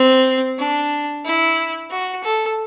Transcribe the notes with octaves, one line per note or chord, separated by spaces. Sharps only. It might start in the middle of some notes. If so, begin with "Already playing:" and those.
Already playing: C4
D4
E4
F#4
A4